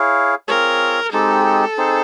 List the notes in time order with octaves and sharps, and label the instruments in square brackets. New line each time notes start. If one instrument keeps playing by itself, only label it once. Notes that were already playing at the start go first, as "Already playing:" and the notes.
Already playing: [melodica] E4 G#4 C#5 F5
[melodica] C4 F4 G#4 C#5 [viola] A#4
[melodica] G#3 C4 D#4 G4 [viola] A4
[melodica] C4 D#4 G#4 C5